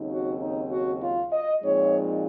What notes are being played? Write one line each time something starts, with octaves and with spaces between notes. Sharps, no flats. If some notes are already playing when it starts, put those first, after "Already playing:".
Already playing: D#2 C#3 F#3 C4 D#4
F#4
D#4
F#4
F4
D#5
A#2 F3 G#3 C4 D#4 C#5